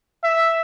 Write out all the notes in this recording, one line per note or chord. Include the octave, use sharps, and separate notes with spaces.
E5